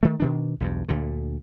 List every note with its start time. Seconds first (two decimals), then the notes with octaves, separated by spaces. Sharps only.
0.03 D#3 A3
0.20 B2 D#3 D4
0.60 B1 E2 G2
0.89 D2 A#2 D3